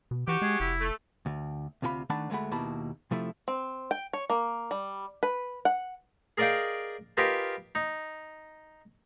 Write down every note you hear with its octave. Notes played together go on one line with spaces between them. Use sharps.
B2
E3 F#4 G4
G#3 G#4
F1 E4
A3
D2
D2 C3 F4 G4 B5
D#3 A3 D4 F#5 A5 B5
D2 G#3 A3 F#5 B5
D#2 B2 A#3 E4 A5 B5
C3 F3 A3 E4
C4
G5
C#5
A#3
G3
B4
F#5
G#4 A#4 D5 D#5 F5 G5
F4 G4 A#4 B4 D#5 G#5
D#4